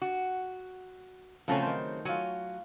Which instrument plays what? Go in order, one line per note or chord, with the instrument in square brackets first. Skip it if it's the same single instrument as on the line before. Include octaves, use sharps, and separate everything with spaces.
[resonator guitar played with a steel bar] F#4
[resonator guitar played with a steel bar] C#3 F#3 C4 [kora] F3 A3 C#4
[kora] D#3 C5
[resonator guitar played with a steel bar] F#3 G#5 [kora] F4 C#5